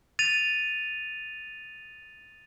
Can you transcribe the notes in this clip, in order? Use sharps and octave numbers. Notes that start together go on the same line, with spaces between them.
A6 D#7 F7